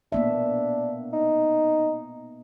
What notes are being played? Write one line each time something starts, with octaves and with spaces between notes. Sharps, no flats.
A#3 B3 D4 E5
D#4